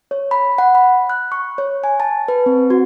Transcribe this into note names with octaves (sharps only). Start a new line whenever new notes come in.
C#5
B5
F#5
B5
F#6
C#6
C#5
G#5
A5
B4
C4
F#4